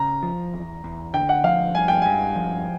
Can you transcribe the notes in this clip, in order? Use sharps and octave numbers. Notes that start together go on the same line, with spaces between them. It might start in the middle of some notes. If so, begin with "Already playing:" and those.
Already playing: C#3 A#5
F3
E2
E2
D3 G5
F#5
F3 F5
G2 G#5
G5
G2 G#5
F3